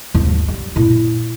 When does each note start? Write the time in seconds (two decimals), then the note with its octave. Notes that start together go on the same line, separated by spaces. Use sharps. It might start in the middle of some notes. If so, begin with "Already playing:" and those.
0.15 D#2 G#2
0.48 G3
0.76 A#2 E4